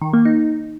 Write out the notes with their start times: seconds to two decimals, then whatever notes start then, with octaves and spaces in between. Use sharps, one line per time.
0.02 D#3
0.13 A#3
0.25 D#4